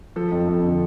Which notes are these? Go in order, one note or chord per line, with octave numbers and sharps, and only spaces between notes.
F3 A4
F2
F2
D3